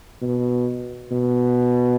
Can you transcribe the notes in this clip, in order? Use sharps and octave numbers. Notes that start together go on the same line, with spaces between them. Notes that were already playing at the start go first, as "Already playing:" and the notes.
B2
B2